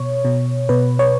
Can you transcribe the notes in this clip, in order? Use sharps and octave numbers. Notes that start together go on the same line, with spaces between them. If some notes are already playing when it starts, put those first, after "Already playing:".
Already playing: B2 C#5
B2
B2 B4
C#5